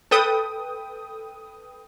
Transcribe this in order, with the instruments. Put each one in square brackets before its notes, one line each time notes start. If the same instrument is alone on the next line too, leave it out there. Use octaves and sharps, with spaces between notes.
[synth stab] A4 B4 G5 D#6